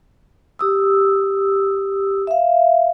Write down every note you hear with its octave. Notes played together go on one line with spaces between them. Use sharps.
G4 D#6 E6
E5 F5